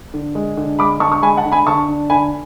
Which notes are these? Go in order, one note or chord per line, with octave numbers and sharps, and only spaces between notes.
D3
G#3
D3
G#3 B5 D6
D3 A5 C#6
C#6
G#3 G#5 B5
F#5 A5
D3
G#5 B5
D3 A5 C#6
D4
D3 G#5 B5